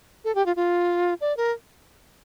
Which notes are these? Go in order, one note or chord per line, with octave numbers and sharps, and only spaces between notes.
A4
G4
F4
F4
D5
A#4